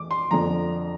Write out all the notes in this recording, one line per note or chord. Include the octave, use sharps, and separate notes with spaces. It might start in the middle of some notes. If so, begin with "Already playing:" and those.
Already playing: E2 D6
C6
F2 D3 F3 A#5